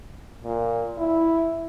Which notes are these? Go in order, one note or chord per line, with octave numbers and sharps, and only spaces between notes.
A#2
E4